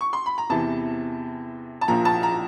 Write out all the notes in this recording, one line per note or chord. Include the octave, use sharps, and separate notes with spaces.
C#6
C6
B5
A#5
E2 C3 E3 A5
A5
A#1 A#2 F3 A#5
A5
A#5